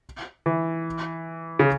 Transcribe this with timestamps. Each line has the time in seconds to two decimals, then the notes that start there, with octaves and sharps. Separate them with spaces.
0.46 E3
1.59 C#3